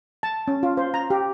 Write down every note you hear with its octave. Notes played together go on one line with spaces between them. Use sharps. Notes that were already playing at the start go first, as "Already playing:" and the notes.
A5
C#4
F4
C5
A#5
G4